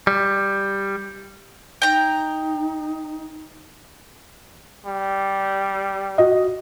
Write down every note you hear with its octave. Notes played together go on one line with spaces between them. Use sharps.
G3
D#4 G5 A#5
G3
F#4 D#5